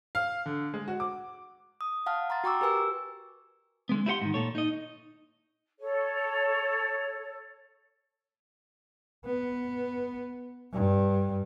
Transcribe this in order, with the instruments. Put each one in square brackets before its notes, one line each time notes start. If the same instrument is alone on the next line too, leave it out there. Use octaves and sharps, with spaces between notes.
[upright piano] F5
D3
G#3
F#4
D6
[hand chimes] D#6
F5 F#5 A5 F6
A#5 C6 A6
F#4 G5 A#5 C#6 D6 E6
G4 A#4 B4 G#5 E6
[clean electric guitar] D3 G#3 B3
E4 G4 B4 F#5 C6
G#2 D#3
A#2 A4 C#5
D#4 D#5
[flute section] A4 C#5
[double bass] B3
G2